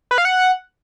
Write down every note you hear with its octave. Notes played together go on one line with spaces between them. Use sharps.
B4
F5
F#5